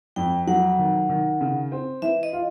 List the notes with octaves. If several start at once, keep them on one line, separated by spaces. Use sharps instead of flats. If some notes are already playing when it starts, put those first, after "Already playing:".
F2 G5
F#3 F#5
D#3
D#3
C#3
C4
E3 E5
D#5
F4